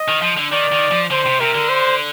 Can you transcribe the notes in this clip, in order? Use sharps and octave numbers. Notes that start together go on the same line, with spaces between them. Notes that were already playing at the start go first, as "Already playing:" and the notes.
Already playing: D#5
D#3
F3
D3
D#3 D5
D#3
F3
D3 C5
C3
C3 A#4
D3
C5